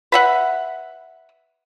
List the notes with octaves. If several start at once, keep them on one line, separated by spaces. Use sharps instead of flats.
B4 E5 F#5